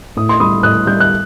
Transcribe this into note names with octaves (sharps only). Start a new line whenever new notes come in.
A2 D#6
C6
G3 B5 D#6
A2 D#6 F#6
G3 G6
F#6